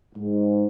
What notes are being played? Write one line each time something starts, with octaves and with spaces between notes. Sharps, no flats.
G#2